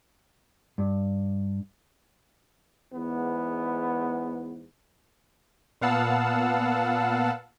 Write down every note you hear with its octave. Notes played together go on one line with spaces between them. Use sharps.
G2
E2 G#2 B3
A#2 B3 F5 F#5 A5 E6